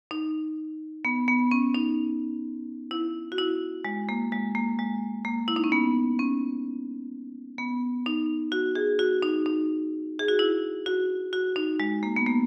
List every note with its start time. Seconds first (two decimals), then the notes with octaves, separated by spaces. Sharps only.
0.11 D#4
1.05 B3
1.28 B3
1.51 C#4
1.74 D#4
2.91 E4
3.32 F#4
3.38 E4
3.85 G#3
4.09 A#3
4.32 G#3
4.55 A#3
4.79 G#3
5.25 A#3
5.48 E4
5.56 D#4
5.64 C#4
5.72 B3
6.19 C#4
7.58 B3
8.06 D#4
8.52 F#4
8.75 G#4
8.99 F#4
9.23 D#4
9.46 D#4
10.19 G#4
10.28 F#4
10.39 E4
10.86 F#4
11.33 F#4
11.56 D#4
11.80 G#3
12.03 A#3
12.16 B3
12.26 A#3